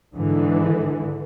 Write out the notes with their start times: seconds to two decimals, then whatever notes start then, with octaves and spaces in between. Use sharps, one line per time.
0.14 G#2 D3 E3